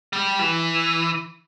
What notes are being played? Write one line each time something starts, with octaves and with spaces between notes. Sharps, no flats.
G3
E3